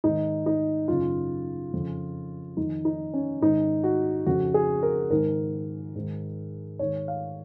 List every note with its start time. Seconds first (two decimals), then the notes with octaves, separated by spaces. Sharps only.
0.04 G#2 D#3 D#4
0.46 D#4
0.88 F#2 C#3 F4
1.73 F2 C#3
2.57 F2 D#3 D#4
2.85 D#4
3.14 C#4
3.42 G#2 D#3 D#4
3.84 F#4
4.26 F2 C#3 F#4
4.54 G#4
4.83 A#4
5.10 G#2 D#3 A#4
5.95 G#2 D#3
6.79 G#2 D#3 C#5
7.08 F5